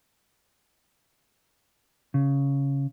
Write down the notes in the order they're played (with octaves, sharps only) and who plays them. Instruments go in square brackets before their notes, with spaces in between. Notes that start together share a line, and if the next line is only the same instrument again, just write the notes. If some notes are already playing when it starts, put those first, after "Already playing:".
[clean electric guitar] C#3